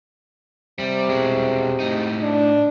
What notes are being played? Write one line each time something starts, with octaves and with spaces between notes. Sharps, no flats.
C3 G3
B2 G#3
A2 D#4
D4